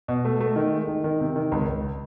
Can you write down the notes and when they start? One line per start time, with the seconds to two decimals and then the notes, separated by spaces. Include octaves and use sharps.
0.08 B2
0.25 A3
0.41 A3
0.56 D#3
0.73 G#3
0.88 D#3
1.04 D#3
1.20 C3
1.36 D#3
1.52 C#2
1.68 C#2